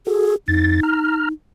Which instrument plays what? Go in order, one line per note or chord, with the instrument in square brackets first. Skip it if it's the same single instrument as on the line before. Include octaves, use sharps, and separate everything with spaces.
[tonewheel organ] F#4 A4 [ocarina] G#4
[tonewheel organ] F2 A6 [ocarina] D#4
[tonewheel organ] A#5 F6